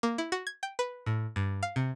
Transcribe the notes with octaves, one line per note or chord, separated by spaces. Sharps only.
A#3
E4
F#4
G#6
G5
B4
A2
G2
F5
C3